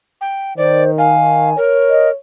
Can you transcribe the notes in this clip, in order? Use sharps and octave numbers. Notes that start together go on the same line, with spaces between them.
G5
D#3 C5 D5
F5 G#5
A#4 C#5
D#5